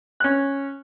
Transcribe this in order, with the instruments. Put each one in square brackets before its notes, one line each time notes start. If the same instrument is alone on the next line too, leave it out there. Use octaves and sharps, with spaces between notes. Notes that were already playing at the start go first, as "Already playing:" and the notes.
[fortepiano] C#4 F#6